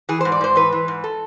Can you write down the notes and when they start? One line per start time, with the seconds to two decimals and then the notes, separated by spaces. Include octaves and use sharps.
0.09 E3 G#4
0.21 G#2 C5
0.32 D5
0.41 G#2 C5
0.56 E3 B4
0.73 E3
0.88 G#2
1.04 A4